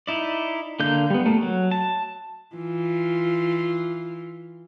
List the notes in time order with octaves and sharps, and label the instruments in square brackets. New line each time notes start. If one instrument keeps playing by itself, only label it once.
[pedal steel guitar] D#4 E4 D5
D3 A#3 G6
G3 B3
A3 A#3
F#3
A5
[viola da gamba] E3 F4